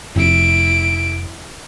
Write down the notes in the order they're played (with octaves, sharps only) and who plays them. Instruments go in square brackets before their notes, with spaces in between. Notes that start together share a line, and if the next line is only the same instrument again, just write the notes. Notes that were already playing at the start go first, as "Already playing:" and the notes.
[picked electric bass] F1 [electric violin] E4 D7